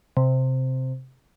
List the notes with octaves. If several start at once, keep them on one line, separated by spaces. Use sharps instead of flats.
C3